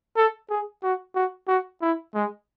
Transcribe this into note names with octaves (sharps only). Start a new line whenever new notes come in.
A4
G#4
F#4
F#4
F#4
E4
G#3